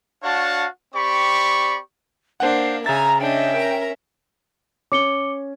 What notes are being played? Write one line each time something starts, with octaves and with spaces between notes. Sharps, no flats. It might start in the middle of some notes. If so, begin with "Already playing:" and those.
D4 F#4 C#5 F5 F#5 A5
C4 G4 D5 B5 C#6
A#3 D4 C5 F5 F#5
C#3 E5 G#5 A#5 A6
C#4 D4 D#5 E5 G5
A#4 A#5
C#4 D6 C#7 G7